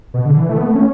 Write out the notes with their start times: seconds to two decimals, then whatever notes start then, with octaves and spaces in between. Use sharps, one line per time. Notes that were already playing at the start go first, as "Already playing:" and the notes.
0.14 B2
0.26 D3
0.37 E3
0.49 A3
0.58 B3
0.66 A3
0.75 C#4